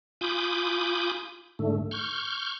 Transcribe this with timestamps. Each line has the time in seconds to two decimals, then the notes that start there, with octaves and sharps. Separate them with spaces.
0.21 F4 G#5 B5 D6 D#6 G6
1.59 G#2 D3 A3
1.91 C#6 F6 G6